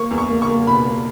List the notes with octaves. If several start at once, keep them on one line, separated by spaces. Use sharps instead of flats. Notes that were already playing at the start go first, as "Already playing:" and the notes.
Already playing: A#3 C#6
E2
C#6
A#3
C#6
A#3
B2 B5
A#3